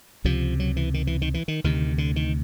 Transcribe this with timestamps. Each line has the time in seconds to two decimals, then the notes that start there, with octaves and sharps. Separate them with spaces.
0.24 C#2 C3 F3
0.60 F#3
0.76 E3
0.94 D#3
1.07 E3
1.22 D#3
1.34 E3
1.48 D#3
1.64 D2 C3 D#3
1.98 D3
2.16 D#3